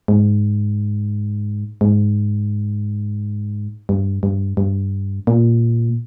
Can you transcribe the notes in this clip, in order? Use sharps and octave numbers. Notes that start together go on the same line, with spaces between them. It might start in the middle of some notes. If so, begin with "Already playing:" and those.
G#2
G#2
G2
G2
G2
A#2